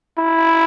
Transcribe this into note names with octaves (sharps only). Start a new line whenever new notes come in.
E4